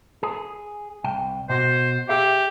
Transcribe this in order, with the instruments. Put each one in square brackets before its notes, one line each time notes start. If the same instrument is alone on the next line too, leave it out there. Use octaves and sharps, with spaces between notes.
[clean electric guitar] G#4
C2 G5
[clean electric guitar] B2 F#4 [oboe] C5
[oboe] G4 [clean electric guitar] G#4 E5